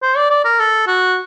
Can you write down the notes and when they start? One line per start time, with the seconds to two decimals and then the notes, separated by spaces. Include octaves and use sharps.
0.02 C5
0.17 D5
0.30 D5
0.45 A#4
0.60 A4
0.87 F#4